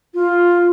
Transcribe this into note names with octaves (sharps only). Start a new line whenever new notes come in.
F4